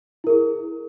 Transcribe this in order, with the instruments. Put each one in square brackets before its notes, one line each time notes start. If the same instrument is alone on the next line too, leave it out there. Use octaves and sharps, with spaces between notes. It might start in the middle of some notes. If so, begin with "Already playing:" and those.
[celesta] E4
A#4
G#4